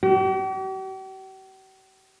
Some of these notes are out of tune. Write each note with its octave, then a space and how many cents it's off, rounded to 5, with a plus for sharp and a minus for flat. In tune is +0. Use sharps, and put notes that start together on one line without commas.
G4 -45